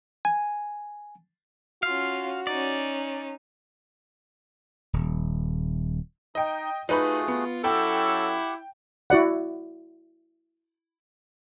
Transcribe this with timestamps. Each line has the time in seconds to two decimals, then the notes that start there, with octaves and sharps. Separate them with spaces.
0.25 G#5
1.83 C#4 F4 F#4 F5
2.47 C#4 D#4 D5
4.93 D#1
6.35 D#4 D#5 G5
6.89 A3 D#4 F4 F#4 G#4 B4 B5
7.28 B3
7.64 F#3 C#4 E4 G4 A4 F#5 G5
9.10 E4 F#4 D5 F#5